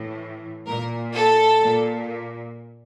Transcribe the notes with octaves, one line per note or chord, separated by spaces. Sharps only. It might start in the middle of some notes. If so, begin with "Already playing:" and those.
Already playing: A2 E3
A#2 A#4
A4
A#2